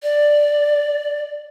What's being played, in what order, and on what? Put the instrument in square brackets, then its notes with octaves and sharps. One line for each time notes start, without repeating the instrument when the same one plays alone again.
[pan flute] D5